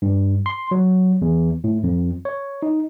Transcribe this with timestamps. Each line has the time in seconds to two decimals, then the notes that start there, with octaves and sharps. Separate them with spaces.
0.02 G2
0.46 C6
0.71 F#3
1.22 E2
1.64 A2
1.84 F2
2.25 C#5
2.62 D#4